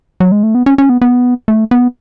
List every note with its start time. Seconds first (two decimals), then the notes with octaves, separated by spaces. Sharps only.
0.20 F#3
0.32 G#3
0.43 A3
0.55 B3
0.66 C#4
0.78 C#4
0.89 B3
1.01 B3
1.48 A3
1.71 B3